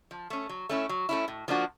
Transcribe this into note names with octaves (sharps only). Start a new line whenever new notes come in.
F3
A3 C#4
F#3
A3 C#4 E4
F#3
A3 C#4 E4
A2
F3 A#3 D4 F#4